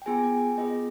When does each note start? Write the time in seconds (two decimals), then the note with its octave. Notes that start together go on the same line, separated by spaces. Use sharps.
0.02 G5
0.06 B3 F4 G#4 G#5
0.17 G#5
0.23 G5
0.57 B3 F4 G#4 D#5